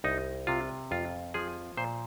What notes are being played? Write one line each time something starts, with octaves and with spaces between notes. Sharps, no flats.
C2 D#4
C3 F4
F2 F4
F3 G#4
A#2 C5